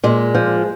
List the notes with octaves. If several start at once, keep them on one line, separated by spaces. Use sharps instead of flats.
A#2 G#3
F3